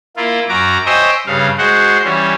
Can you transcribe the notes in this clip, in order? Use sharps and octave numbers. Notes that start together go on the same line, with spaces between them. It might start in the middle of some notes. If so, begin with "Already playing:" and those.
A#3 E4 F4
F#2 F#4 A#5 D6
C5 C#5 D#5 E5 G5 G#5
G2 C#3 C#4 F5
G#3 F#4 C5 F#5
E3 G3 C#4